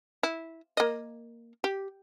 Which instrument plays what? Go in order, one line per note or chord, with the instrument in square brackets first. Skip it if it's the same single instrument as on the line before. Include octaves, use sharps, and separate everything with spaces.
[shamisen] E4
A#3 D#5
G4